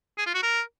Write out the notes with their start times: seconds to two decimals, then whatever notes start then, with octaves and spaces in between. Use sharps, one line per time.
0.18 G#4
0.26 F4
0.34 F#4
0.42 A#4